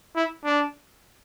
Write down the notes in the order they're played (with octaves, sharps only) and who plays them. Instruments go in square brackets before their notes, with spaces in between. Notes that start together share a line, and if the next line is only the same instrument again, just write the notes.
[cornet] E4
D4